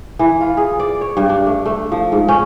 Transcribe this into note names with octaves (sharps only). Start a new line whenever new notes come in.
E3
F4
G#4
D5
C#5
G2
D4
A3
A3
F3
G#2
C#4